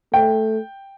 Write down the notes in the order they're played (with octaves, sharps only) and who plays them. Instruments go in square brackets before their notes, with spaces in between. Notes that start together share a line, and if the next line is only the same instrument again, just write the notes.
[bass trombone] A3 [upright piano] G5